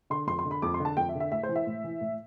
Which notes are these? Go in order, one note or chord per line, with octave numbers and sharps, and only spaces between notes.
D3 C6
F2 C6
C6
D3
B5
F2 D6
C6
D3
A5
F2 G5
E5
D3
E5
A2 E5
C5
E3
E5
A2
E3
A2